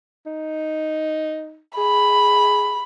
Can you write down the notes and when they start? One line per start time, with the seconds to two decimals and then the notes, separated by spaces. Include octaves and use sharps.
0.26 D#4
1.78 G#4 B5